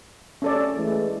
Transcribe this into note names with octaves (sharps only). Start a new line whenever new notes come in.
C#4 A4 D5
E3 G#3 A3